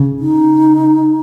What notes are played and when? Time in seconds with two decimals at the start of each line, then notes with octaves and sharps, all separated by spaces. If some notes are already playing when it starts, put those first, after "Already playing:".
Already playing: C#3
0.20 D#4